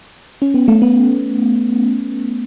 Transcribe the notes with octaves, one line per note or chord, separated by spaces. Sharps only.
C#4
B3
A3
B3